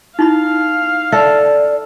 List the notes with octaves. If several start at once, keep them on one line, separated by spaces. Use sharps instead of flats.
D#4 E4 F5 B5
A4 D5 E5